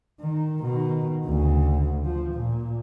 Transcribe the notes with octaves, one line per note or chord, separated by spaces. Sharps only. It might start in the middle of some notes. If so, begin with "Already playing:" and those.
D#3
B2 D#3
D2 C#3
F3
A#2